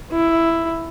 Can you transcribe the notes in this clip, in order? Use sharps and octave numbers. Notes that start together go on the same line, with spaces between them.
E4